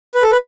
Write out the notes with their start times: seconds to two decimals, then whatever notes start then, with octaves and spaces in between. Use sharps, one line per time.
0.15 B4
0.23 A4
0.32 B4